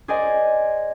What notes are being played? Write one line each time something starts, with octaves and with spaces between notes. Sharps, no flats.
G#4 C5 D5 D#5 G#5